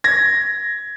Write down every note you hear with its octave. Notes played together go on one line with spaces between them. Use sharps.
G#6 A#6